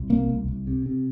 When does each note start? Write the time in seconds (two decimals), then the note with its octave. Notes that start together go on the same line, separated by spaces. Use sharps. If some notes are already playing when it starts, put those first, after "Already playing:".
Already playing: C2
0.10 C3 A#3
0.29 C2
0.48 C2
0.67 C3
0.86 C3